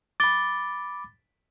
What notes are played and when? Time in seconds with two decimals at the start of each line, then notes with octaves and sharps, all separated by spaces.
0.20 B5 D6 A6 G7